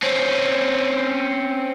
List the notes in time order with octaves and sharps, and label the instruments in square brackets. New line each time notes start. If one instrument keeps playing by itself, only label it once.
[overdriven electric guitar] C4 C#4